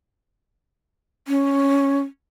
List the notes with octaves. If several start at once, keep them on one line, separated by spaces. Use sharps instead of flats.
C#4